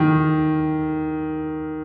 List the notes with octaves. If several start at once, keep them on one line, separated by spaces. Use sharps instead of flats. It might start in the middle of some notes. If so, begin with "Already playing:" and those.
Already playing: D#3